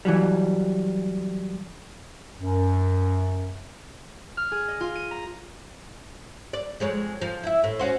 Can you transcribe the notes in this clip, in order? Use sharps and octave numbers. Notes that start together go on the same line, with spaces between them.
E3 F#3 G3
F#2
F6
G#4
D#5
F4
D#7
A#5
D5
F2 G#3 C#5
F3
E4 E5
A2
C#4 F#4 C5